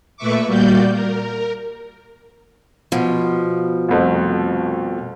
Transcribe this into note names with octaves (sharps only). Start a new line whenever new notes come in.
A#2 A3 B4 E5 C#6 D6
A#2 G3 A#3 F#4 D5 G6
A#4
B2 F3
C2 F2 A3